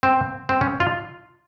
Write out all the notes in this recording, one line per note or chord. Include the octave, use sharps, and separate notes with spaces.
C4
C4
C#4
F4